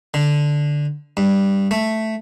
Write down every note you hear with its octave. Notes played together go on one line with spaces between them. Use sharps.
D3
G2
A3